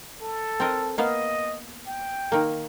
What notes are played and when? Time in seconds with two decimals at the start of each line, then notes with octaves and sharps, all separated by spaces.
0.21 A4
0.60 C4 A#4 D#5
0.98 A#3 B3 D#5 F5
1.87 G5
2.32 D#3 A#3